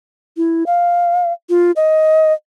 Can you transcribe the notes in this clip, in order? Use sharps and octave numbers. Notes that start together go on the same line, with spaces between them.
E4
F5
F4
D#5